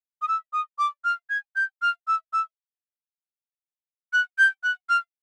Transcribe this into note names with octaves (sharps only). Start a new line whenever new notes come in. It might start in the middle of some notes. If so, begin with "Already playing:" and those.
D#6
E6
D#6
D6
F6
G#6
G6
F6
E6
E6
F#6
G6
F#6
F6